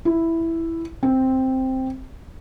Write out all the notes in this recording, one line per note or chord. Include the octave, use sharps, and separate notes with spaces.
E4
C4